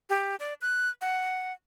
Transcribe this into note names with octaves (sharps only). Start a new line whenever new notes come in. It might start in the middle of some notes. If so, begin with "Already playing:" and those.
G4
D5
F#6
F#5